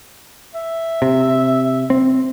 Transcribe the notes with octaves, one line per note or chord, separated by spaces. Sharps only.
E5
C3
C4